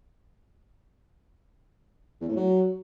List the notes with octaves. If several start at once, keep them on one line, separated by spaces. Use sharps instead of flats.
E2
A2
F#3